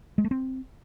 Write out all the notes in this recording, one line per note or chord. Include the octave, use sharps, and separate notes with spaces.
G#3
A3
C4